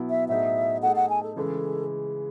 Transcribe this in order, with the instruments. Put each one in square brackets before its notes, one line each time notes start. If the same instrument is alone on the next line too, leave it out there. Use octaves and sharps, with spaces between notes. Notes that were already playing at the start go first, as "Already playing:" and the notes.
Already playing: [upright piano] B2 F#3 B3 E4
[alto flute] E5
[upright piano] A2 F#3 B3 D#4 G#4 [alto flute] E5
[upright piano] A3 D#4 G#4 [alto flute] F#5
[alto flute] F#5
G#5
A4
[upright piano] C#3 E3 G#3 [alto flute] A4